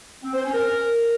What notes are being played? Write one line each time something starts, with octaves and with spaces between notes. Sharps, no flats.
C4
C5
C#4
A#4